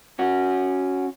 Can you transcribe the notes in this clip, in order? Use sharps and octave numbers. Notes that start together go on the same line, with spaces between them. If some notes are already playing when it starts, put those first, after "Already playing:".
C#4 F#4